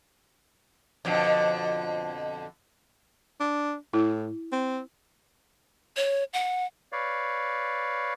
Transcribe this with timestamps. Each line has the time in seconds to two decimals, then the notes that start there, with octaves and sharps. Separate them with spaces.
1.05 F2 B2 D3
3.40 D4
3.94 A2 E4
4.52 C4
5.97 C#5
6.33 F#5
6.92 B4 C#5 D5 F5